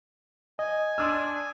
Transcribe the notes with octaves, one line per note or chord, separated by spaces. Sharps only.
D#5 G#5
D4 C6 D#6 E6